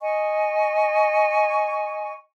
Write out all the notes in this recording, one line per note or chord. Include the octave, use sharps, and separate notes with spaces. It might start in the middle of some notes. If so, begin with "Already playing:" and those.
D#5 G#5 C#6